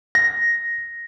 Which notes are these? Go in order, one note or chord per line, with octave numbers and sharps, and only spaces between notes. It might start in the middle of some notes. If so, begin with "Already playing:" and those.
A#6